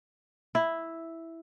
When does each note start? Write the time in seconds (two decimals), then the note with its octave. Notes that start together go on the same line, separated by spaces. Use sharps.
0.55 E4